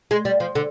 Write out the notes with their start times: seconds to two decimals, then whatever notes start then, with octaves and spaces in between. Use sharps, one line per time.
0.11 G#3
0.25 G3
0.40 F3
0.55 D3